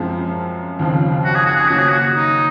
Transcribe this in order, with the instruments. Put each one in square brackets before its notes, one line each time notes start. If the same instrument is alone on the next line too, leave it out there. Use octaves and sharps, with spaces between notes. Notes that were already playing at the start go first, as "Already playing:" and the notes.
Already playing: [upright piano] F#2 F3 G#3 C4
D#2 C#3 F3 C4
[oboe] F#4
G#4
F#4
G#4
[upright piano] C#3 F#3 A#3 [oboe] F#4
[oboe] G#4
F#4
D#4